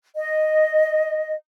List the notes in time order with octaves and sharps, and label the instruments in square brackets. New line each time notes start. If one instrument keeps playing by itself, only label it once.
[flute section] D#5